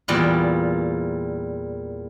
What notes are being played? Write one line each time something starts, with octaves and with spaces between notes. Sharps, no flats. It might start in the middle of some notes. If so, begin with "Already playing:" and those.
E2 A#2 G3 F4 F#5